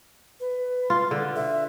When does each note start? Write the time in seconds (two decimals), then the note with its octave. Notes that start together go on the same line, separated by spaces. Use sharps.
0.40 B4
0.90 F4
1.11 D3
1.36 E5